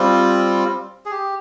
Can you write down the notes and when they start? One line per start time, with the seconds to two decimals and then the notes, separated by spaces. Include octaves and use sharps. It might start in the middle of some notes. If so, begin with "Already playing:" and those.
Already playing: G3 C4 F4
1.06 G#4
1.11 G4